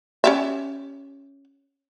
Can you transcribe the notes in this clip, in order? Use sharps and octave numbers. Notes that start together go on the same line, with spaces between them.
C#4 G4 E5